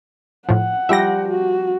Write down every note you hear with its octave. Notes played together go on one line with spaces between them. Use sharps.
A2 F3 F#5
F3 G3 E5 G5 A#6
F#4